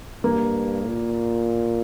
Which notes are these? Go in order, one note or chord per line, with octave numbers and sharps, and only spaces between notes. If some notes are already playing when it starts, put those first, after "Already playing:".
G2 A#3
A#2